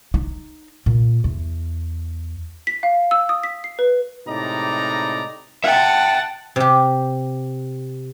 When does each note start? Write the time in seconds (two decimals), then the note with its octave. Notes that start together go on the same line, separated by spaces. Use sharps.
0.14 D#4
0.86 A#2
1.24 E2
2.67 B6
2.83 F5
3.11 E6
3.29 D#6
3.43 B6
3.64 C7
3.79 B4
4.27 A2 C3 G#3 D#4 D5 A#5
5.64 E5 F#5 G5 A5
6.56 C3 G4